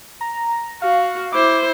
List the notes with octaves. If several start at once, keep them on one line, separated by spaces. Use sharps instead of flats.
A#5
F#4 F5
E4 C5 D6